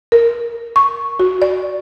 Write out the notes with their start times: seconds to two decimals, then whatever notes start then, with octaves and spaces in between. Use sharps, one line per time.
0.12 A#4
0.76 C#6
1.20 F#4
1.42 D5